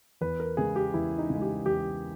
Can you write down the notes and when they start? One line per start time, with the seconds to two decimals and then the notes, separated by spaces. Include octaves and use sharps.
0.21 E2 B4
0.40 A#4
0.57 C#3 G#3 G#4
0.76 G4
0.94 E2 E4
1.18 D#4
1.30 C#3
1.35 G#3
1.42 G4
1.66 E2 G4